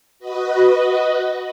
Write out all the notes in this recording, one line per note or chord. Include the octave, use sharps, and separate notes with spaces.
F#4 B4 D#5